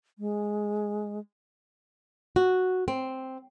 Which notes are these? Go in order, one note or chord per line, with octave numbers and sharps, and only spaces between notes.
G#3
F#4
C4